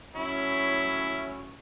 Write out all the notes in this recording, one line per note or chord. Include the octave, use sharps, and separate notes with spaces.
A2 F#3 C#4 E4